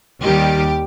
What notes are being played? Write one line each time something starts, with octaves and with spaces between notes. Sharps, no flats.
D#2 D#3 G3 G4